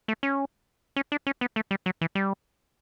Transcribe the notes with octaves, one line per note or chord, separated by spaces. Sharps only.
A3
C#4
C#4
D4
C#4
B3
A3
G3
F#3
E3
G3